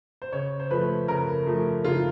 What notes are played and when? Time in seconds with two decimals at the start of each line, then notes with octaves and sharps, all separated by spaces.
0.22 C5
0.32 C#3 C#5
0.60 C5
0.71 F3 A3 B4
1.08 C#3 A#4
1.46 F3 A3
1.84 C#3 F4